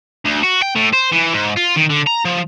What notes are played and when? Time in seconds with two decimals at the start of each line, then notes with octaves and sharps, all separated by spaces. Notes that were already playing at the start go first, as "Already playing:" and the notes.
0.25 D2
0.43 F#4
0.62 G5
0.75 A2
0.93 C5
1.12 E3
1.34 G#2
1.57 F4
1.77 D#3
1.90 D3
2.07 A#5
2.25 F3